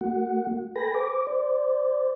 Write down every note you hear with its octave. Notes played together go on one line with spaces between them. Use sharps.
A3 A#3 F#4 F#5
A4 B4 G5 G#5 B5 A#6
C5 D6
C5 D5